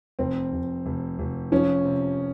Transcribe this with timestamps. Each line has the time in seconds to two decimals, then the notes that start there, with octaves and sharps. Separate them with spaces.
0.19 F1 C4
0.52 F1
0.86 F1
1.19 F1
1.52 F3 C#4
1.85 C3